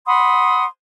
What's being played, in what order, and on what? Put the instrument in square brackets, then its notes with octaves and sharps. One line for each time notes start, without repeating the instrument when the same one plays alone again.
[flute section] F#5 B5 C6 D#6